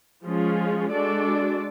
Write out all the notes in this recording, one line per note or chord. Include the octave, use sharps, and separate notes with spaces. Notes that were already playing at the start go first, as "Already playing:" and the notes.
F3 G#3 C#4 F4 G#4
G#3 D4 F#4 A4 D5